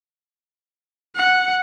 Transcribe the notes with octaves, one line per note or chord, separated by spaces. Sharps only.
F#5